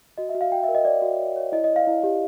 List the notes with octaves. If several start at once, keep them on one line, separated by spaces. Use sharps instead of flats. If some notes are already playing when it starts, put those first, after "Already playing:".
F#4 D#5
E5
F#4
F5
F#4 G5
E5
A#4
D#5
C#5 D5
F#4
C#5
C#5
E4 D#5
D#5
D5
F5
E4
G4